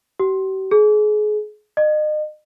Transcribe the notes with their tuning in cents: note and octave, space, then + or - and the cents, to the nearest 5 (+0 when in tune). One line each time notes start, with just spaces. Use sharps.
G4 -45
G#4 +30
D#5 -35